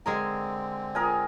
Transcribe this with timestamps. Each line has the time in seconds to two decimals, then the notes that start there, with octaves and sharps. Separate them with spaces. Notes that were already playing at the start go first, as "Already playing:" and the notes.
0.06 D3 G#3 C4 G#4 A#4
0.95 G#4 A#4 G#5